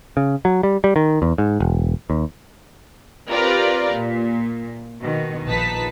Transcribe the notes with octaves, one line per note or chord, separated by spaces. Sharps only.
C#3
F#3
G3
G3
D#3
E2
G#2
E1
D#2
C4 F4 G4 A#4 B4 D5
A#2
B2 D#3
A#1 D#4 B4 A5 B6